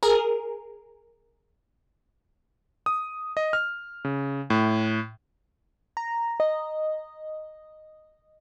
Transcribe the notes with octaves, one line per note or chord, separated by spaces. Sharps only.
G#4 A#4
D#6
D#5
F6
C#3
A2
A#5
D#5